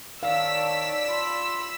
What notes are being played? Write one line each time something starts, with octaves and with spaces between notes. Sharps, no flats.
D#3 C#5 D5 F5 A5 E6 B6
F4 B5 C6